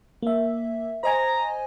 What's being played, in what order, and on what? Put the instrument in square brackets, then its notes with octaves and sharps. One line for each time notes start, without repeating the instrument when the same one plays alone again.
[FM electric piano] A#3 E5
[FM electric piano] C5 D#5 G#5 [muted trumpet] A#5